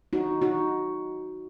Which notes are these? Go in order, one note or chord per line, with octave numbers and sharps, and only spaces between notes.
D#4 F#4
D#4 F#4